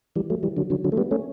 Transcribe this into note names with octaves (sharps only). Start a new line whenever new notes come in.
E3 G3
F#3 A3
E3 G3
D3 F#3
D3 F#3
D3 F#3
A3
G3 B3
A3 C#4